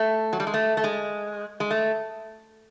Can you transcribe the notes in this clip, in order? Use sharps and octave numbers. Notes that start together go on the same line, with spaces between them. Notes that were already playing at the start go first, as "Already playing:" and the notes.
Already playing: A3
F#3
G3
G#3
A3
A3
G#3
G#3
A3